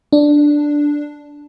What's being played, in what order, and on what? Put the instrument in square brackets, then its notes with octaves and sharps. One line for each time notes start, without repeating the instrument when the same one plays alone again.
[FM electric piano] D4